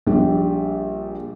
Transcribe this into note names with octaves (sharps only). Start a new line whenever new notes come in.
A#1 G3